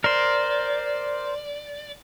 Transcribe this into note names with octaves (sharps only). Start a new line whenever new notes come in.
A#4 C5 D5